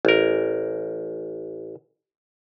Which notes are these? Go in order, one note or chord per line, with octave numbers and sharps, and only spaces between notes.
A1 A#4